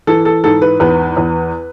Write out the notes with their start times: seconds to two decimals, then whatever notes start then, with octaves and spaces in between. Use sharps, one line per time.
0.07 E3 A4
0.25 A4
0.44 G#2 A4
0.62 B4
0.80 E2 B4
1.17 E2